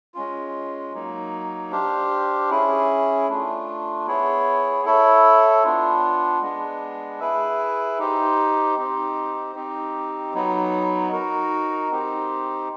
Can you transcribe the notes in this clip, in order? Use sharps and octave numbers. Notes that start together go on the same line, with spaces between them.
G#3 C#4 F4
F#3 A#3 D#4
D4 G4 C5 F5
C#4 E4 G#4
A3 D4 F4
B3 E4 G#4 C#5
E4 A4 C#5 E5
B3 D4 F4
G#3 B3 D4
E4 G#4 B4 E5
D#4 G4 C5
C4 D#4 G4 C5
C4 D#4 G4
F#3 B3 D#4
D#4 F#4 A#4
C4 D#4 G4 C5